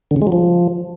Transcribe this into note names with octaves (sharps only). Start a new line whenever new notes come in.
D3
C#3
G#3
F#3
F3